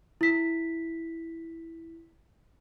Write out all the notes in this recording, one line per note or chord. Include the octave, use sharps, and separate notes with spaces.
E4 B6